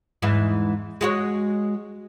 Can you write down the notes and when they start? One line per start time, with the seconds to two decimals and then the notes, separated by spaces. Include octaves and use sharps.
0.22 E2 G#2 E3
1.01 G#3 F#4 C#5